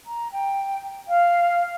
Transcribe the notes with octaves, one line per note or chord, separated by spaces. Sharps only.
A#5
G5
F5